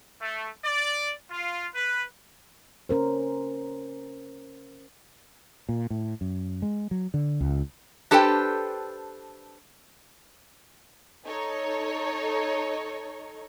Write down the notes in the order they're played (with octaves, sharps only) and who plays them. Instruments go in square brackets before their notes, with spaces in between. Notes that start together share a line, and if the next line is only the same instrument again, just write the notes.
[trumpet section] A3
D5
F4
B4
[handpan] C#4 A#4 C5
[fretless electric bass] A#2
A2
F#2
G#3
F#3
D3
C#2
[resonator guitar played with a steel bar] D4 G4 A4 B4 C5 G5
[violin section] D#4 A4 C#5